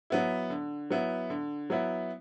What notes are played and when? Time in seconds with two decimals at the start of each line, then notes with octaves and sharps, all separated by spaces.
0.10 F#3 B3 E4
0.50 D3
0.90 F#3 B3 E4
1.30 D3
1.70 F#3 B3 E4